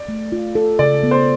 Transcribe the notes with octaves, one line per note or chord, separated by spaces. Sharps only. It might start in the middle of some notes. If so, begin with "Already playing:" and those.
Already playing: D5
A3
F4
A4
C#3 D5
B3
C5